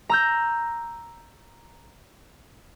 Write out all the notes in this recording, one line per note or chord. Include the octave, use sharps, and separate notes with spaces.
A#5 E6 G6